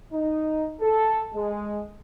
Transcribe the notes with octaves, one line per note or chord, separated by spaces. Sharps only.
D#4
A4
G#3